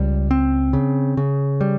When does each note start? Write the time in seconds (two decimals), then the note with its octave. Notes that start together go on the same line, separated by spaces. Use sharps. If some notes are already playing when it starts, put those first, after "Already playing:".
Already playing: C#2 G3
0.31 C4
0.73 C#3
1.17 C#3
1.61 G3